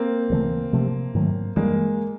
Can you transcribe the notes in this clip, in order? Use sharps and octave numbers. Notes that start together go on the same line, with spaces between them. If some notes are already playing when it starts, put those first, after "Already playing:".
Already playing: A#3 C4
D2 C#3 E3 A3
C3 F3 A3
G#2 D#3 F#3 A3
G2 E3 G3 G#3 A#3